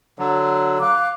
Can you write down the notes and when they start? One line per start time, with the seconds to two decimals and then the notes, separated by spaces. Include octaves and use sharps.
0.19 D3 F#3
0.79 F5 D6 F#6